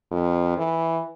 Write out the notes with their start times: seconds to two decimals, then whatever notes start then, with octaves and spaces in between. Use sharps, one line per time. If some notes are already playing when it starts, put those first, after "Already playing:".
0.11 F2
0.58 E3